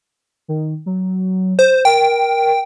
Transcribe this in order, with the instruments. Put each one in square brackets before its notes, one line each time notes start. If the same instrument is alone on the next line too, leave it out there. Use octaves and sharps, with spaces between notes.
[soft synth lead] D#3
F#3
[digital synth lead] C5
[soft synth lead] A#4 [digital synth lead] G5